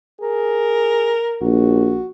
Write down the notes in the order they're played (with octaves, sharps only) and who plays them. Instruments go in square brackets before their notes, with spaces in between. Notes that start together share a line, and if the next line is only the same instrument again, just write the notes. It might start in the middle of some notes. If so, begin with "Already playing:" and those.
[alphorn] G#4 [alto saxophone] A#4
[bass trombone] A#1 [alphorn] F#4